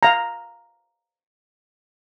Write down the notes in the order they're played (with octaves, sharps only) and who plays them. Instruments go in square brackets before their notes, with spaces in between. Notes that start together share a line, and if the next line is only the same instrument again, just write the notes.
[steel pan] F5 A#5